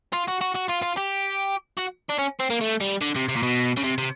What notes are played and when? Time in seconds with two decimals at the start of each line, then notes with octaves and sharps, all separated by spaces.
0.13 F4
0.28 F#4
0.41 F#4
0.55 F#4
0.68 F4
0.82 F4
0.97 G4
1.79 F#4
2.10 D4
2.19 C#4
2.40 C4
2.50 A#3
2.61 A3
2.81 G3
3.01 D3
3.16 C3
3.29 C3
3.36 A#2
3.43 B2
3.77 C#3
3.83 C3
3.98 C3